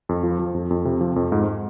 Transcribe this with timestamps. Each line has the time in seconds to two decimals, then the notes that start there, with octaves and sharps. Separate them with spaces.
0.09 F2
0.23 F3
0.39 F3
0.55 F2
0.71 F2
0.85 C3
1.01 F3
1.16 F2
1.32 G#2